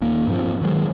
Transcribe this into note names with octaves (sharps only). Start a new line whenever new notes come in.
D#1 D#3 A#3
G2 A#2 F3 C4
D#3 F#3 G#3